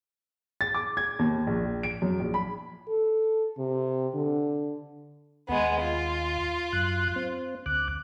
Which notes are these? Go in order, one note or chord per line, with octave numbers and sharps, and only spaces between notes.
A6
D6
G#6
D#2
A#1
D7
F#2
A#1
B5
A4
C3
D3
D#2 G#3 B3
F4
F#2 F#6
C4
D2 D6 F#6